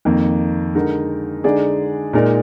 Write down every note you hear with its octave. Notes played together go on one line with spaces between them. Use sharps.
F2 D#3 A#3
D3 G#3 D#4 A#4
D3 G#3 D#4 G#4 D5
A#2 G#3 D#4 A#4 D5